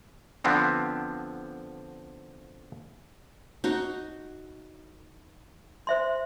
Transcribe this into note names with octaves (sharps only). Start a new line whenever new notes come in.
D3 F3 B3 C4 D4
D#4 F#4
C5 E5 C6